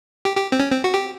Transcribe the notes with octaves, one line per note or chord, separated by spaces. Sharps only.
G4
G4
C4
C#4
C4
F#4
G4